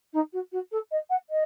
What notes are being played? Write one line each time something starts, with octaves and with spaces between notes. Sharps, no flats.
D#4
F#4
F#4
A4
D#5
F#5
D#5